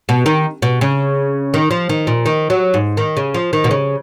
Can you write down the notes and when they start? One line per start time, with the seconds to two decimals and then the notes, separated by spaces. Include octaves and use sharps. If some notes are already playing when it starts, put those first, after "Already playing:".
0.09 B2
0.26 D#3
0.62 B2
0.81 C#3
1.54 D#3
1.71 F3
1.89 D#3
2.07 A#2
2.26 D#3
2.50 F#3
2.74 G#2
2.97 D#3
3.17 C#3
3.34 F3
3.53 D#3
3.64 B2
3.71 C#3